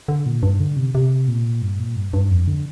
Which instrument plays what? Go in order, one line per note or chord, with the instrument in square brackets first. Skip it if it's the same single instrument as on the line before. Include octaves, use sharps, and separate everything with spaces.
[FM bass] D3
A#2
G2
D3
C3
C3
A#2
G2
A#2
G2
G2
F2
D3